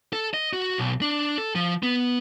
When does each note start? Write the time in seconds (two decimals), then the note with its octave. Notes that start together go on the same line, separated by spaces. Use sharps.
0.13 A4
0.34 D#5
0.53 F#4
0.78 B1
1.01 D4
1.38 A4
1.55 F3
1.83 B3